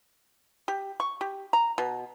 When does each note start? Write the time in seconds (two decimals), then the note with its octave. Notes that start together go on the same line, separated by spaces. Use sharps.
0.68 G4
1.00 C#6
1.21 G4
1.53 A#5
1.78 B2